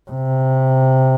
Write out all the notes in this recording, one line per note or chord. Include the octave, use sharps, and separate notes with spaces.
C3